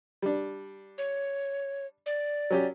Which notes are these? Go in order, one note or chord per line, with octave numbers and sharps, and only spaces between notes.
G3 D4
C#5
D5
F#3 C#4 G4